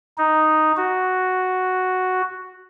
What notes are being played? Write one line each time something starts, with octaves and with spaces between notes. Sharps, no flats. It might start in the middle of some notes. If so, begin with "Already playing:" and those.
D#4
F#4